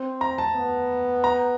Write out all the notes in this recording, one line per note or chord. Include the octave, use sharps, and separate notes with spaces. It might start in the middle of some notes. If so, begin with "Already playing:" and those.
Already playing: C4
A#5
A5
B3
A#5